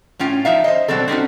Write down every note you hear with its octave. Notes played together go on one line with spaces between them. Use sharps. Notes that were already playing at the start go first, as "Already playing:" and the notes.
A2 C#4 F4 G5
F3 D#4 E5 F5
C5 D#5
B2 F#3 G3 C4 A4
C4 C#4 D#4 F#4